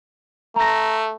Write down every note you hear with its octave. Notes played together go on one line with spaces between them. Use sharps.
A3 A#5 A#6